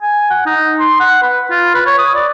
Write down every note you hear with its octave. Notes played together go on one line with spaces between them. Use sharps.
G#5
F#5
D#4
C6
F#5
B4
F4
B4
C#5
D#6
D5